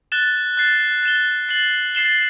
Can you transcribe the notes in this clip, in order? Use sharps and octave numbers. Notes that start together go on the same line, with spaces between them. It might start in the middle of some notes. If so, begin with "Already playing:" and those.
F#6 A6 E7 G7
F#6 A6 C7
A6 E7 G7
A6 C7 F#7
A6 C7 E7 G7